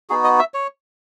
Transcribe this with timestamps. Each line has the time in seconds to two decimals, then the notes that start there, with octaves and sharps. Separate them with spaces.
0.09 B3 D#4 F#4 G#4
0.24 D#5
0.39 E5
0.54 C#5